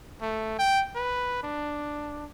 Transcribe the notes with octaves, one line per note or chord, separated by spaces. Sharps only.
A3
G5
B4
D4